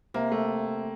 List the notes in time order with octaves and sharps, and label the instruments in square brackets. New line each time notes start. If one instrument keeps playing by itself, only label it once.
[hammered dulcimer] C3 [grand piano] A#3
[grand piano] A3